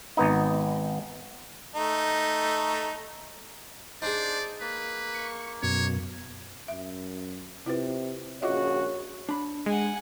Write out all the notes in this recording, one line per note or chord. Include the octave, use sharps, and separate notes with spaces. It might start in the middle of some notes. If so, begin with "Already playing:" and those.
G#1 B3 D#4
A3 D#4
D4 D#4 G#4 C5 D5
A#3 B4
C#6
F#2 B2 C#5
F#2 E5
C3 E4 F4 B4
A#1 C#3 F4 F#4 C#5 D#5 E5
D4 B5
G#3 F#5 G#5